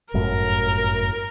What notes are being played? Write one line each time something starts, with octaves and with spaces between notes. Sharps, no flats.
G1 F#2 A2 A#4